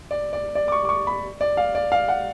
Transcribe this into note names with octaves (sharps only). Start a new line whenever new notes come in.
D5
D5
D5
D6
C#6
D6
C#6
B5
D5
F5
D5
F5
F#5